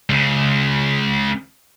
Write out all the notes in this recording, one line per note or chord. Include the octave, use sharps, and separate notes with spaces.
C#2 C#3